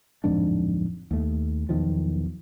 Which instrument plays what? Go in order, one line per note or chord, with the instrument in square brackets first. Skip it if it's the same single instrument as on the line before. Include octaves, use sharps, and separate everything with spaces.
[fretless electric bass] D1 F2 G#2 D4
D#2 A3
B1 E2 D#3 F3